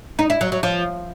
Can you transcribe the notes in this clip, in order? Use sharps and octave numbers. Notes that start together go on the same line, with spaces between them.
D#4
E4
F#3
F#3
F3